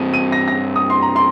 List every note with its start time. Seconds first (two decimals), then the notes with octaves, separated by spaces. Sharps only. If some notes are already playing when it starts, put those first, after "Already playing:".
Already playing: G2 G3 C4 D#7
0.14 D#7
0.32 A#6
0.48 A#6
0.76 D#6
0.90 C6
1.02 A#5
1.16 C6